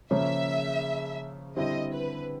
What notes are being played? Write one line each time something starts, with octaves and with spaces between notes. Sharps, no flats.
C#3 F3 A#3 C#4 E5
D3 G3 C4 E4 D#5
B4